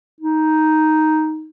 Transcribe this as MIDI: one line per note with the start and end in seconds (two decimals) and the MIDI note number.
0.21 1.50 63